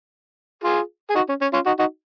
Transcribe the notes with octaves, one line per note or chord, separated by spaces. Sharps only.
F4 G#4
G#4
D#4 F#4
C#4
C#4
C#4 F4
D#4 F#4
D#4 F#4